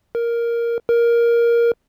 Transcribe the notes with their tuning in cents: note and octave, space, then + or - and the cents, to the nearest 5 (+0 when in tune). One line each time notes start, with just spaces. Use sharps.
A#4 +5
A#4 +10